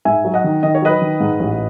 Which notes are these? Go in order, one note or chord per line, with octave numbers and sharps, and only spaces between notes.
G#2 E5 G#5
F#3
D#5 F#5
D#3
D#3 D#5
C#5
F#3 B4 D#5
D#3
G#2
A1